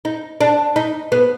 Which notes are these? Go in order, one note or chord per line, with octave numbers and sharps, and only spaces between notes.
D#4
D4
D#4
B3